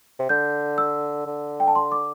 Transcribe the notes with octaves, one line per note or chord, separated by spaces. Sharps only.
C3
D3 G6
E6
D3
G5
A5
C6
D6